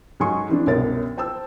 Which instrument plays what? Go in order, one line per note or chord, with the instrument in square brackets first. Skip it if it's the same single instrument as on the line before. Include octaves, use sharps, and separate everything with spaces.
[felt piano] G#2 F#3 G#3 G#5 C6 C#6
E3 C4 D4
C2 F#2 B2 A#4 C#5 A6
C5 G5 A5 E6